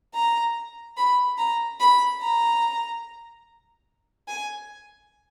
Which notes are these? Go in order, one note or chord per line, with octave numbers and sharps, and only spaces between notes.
A#5
B5
A#5
B5
A#5
G#5